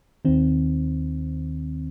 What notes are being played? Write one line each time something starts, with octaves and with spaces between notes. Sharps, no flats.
D#2 D#3 C4